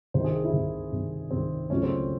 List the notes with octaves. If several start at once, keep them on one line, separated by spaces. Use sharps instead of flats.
C2 C3 D#3 C5
G#4
E4
C2 C3 D#3
C2 C3 D#3
C2 C3 D#3 C4
C#2 C#3 F#3 A3 C#4
C4